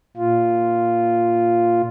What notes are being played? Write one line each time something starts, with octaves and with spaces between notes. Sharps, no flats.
A#2 F4